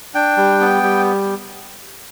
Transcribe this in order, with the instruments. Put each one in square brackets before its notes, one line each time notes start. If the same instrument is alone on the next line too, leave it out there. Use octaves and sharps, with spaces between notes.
[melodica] D4 G5
G3
B3
G3